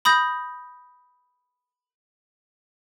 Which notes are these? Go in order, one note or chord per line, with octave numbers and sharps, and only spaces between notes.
B5 D#6 G6 A#6